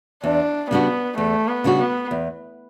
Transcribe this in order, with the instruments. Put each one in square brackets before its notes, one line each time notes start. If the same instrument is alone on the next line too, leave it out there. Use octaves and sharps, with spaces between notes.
[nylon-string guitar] E2 [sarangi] D4
[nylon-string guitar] C#3 G3 D4 F#4 [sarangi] B3
[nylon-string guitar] E2 [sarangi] A3
[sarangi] B3
[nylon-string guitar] C#3 G3 D4 F#4
[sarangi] B3
[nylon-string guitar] E2